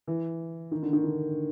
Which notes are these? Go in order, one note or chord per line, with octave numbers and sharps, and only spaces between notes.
E3
D#3
D3
D#3
D3